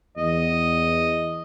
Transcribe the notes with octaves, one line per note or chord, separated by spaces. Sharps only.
E2 D#5